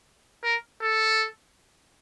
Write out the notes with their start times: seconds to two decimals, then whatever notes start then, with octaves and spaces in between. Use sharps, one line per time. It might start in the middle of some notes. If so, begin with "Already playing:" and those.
0.43 A#4
0.81 A4